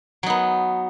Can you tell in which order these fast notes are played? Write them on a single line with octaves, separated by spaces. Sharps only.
F#3 D#4 B3